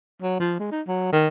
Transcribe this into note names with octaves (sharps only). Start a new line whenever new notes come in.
F#3
F3
G#3
D#4
F#3
D#3